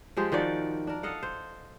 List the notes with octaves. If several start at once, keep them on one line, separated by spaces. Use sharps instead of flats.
F3 G#3 G4 C5
D#3 F3 F#4 D5
D4 A#4
A4 D#5 F5 F#5
C5